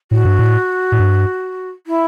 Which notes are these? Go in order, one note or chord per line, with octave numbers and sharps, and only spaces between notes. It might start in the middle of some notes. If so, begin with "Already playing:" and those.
A2 F#4
G2
A2
A2
G2
E4